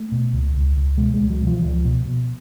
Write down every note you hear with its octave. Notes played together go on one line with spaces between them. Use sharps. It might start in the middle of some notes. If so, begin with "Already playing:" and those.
Already playing: A3
B2
C#2
C#2
C#2
B2 G#3
C#2 G#3
F#3
B2
F3
C#2 F3
B2
B2